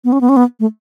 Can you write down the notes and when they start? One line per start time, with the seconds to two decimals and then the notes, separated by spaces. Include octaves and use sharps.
0.05 B3
0.13 C#4
0.21 B3
0.29 C#4
0.36 B3
0.60 A3